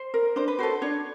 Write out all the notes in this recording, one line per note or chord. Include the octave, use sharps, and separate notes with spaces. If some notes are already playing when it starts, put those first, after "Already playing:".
Already playing: C5
A#4
D4 C5
B4
F#4 A4 C5
D4 C#5